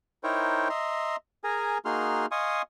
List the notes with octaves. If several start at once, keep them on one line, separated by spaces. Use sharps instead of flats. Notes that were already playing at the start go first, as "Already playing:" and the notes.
D#4 E4 A#4 C5 C#5 G5
D#5 E5 A#5 C6
G#4 A#4 G#5 A#5
A#3 D#4 F#4 G#4 C6 F6
D#5 F5 G#5 C6 C#6 D#6